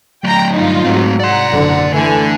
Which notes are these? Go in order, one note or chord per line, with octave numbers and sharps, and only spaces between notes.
F#3 A3 G5 A#5
G2 D#4 F4
G#2 F#3 A3 C4
D5 F#5 A#5 C6
F#1 D3
D3 E3 A3 G#5